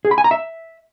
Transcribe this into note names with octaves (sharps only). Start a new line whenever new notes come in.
G#4
B5
G#5
A#5
E5